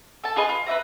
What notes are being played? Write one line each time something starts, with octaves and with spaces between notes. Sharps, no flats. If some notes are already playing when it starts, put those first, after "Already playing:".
A4 A5
F4 G#4 B4 D#5
F4
B4 C5 E5 A#5